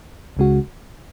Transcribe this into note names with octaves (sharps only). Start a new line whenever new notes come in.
C#2 C#3 G#3 F#4